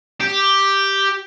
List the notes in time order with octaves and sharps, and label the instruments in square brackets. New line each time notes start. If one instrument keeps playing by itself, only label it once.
[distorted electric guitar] G4